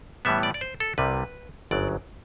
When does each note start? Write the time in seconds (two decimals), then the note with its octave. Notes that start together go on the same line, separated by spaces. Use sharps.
0.25 A2 E3 G3 B3 E5
0.43 D5
0.54 D5
0.61 C5
0.80 A4
0.98 C2 C3 G3 B4
1.71 G1 F#2 F#3 D5